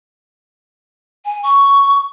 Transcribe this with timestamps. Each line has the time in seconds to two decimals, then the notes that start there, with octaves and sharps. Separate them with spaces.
1.25 G#5
1.43 C#6